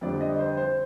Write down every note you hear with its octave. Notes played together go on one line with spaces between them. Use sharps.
F2 D3 G3 D5
D#5
C5
C5